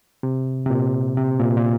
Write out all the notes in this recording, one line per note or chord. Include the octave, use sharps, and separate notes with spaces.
C3
C3
A#2
C3
A#2
A#2